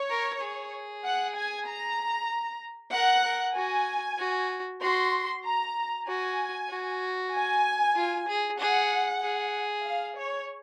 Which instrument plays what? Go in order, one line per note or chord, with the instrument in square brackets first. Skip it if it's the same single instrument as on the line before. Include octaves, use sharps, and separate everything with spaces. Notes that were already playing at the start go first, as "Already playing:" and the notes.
Already playing: [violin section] C#5
[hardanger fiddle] A#4
G#4
[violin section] F#5
G#5
A#5
[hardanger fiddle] A#4 [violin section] F#5
[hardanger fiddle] A#4
[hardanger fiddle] F#4 [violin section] G#5
[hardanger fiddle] F#4
[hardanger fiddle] F#4 [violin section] C6
[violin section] A#5
[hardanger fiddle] F#4 [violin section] G#5
[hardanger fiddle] F#4
[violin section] G#5
[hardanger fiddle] F4
G#4
[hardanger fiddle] G#4 [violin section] F#5
[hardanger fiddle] G#4
[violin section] F5
C#5